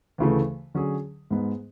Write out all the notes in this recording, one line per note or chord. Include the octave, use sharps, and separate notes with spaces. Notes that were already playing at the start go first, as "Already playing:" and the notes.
D2 C#3 E3 A3
D3 F#3 C#4 G#4
G#2 G#3 B3